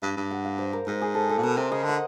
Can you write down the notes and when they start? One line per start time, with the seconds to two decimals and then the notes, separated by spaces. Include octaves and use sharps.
0.02 G2 F5
0.17 G2
0.31 F#5
0.45 F5
0.58 C5
0.73 A#4
0.87 G#2 A#4
1.02 G#4
1.14 A4
1.29 A4
1.38 A#2
1.43 B2 A#4
1.57 C3 C5
1.72 C#3 D#5
1.84 D3
1.89 F#5